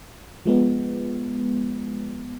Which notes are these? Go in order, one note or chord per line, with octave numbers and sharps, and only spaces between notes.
F3 G#3 B3